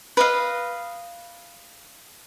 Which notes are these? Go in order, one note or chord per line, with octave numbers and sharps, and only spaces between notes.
B4 D#5 F5